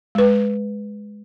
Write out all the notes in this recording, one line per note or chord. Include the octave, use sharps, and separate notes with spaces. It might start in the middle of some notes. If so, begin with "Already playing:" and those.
G#3 B4